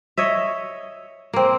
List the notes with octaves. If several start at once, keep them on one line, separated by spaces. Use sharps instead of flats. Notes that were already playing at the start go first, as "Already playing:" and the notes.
C#5 D#5 E5
A#3 C4